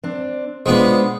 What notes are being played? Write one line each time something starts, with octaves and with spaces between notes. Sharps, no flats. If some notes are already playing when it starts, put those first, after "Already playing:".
C4 D4
G#3 B3 D4 F4 C5